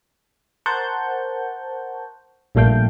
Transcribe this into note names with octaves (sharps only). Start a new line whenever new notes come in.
A#4 C5 F#5 A5 C#6 G6
A#1 G2 A#2 A3 F5 G5